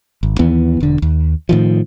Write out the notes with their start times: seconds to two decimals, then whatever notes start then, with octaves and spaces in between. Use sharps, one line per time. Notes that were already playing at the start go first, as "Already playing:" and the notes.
0.23 G#1
0.39 D#2 E3 B3
0.80 E1 D3
1.02 D#2
1.49 A2 D#3 F3